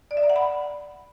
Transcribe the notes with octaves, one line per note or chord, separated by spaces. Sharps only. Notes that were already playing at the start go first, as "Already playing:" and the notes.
D5
E5
A#5
F#5
B5